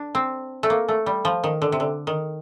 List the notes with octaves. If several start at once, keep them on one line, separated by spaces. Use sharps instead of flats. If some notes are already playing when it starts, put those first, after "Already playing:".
Already playing: D4
C4
A3
A#3
A3
G3
F3
D#3
D3
C3
D3
D#3